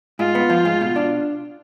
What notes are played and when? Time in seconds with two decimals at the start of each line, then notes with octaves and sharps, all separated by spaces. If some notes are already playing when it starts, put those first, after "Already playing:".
0.19 G#2 F4
0.35 B3
0.50 F3
0.65 G#2
0.81 B2
0.96 D4